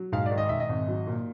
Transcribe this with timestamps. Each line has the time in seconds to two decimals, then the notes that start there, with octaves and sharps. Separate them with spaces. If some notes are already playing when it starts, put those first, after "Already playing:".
Already playing: F#3
0.12 G#2 F5
0.26 D5
0.31 D#3
0.38 D#5
0.49 G#2 E5
0.60 D#5
0.69 G#1
0.88 F#3
1.07 A#2